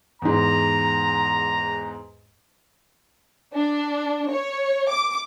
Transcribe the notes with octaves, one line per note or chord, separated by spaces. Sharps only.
E2 G#2 A#5
D4
C#5
D6